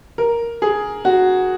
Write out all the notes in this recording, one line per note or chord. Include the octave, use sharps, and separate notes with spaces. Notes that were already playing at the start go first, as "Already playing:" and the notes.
A#4
G#4
F#4